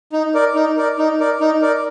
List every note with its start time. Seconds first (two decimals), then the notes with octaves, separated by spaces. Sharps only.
0.13 D#4
0.34 A#4 D5
0.55 D#4
0.77 A#4 D5
0.98 D#4
1.20 A#4 D5
1.40 D#4
1.62 A#4 D5